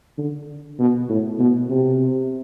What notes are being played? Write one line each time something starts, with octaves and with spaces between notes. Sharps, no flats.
D3
B2
A2
B2
C3